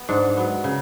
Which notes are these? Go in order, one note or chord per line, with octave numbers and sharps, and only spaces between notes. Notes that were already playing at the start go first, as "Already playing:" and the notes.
Already playing: B3
G#2 D4
F#3 B3
C#3